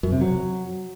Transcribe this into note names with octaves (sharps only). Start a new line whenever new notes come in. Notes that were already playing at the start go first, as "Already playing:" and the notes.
F#2
C3
F#3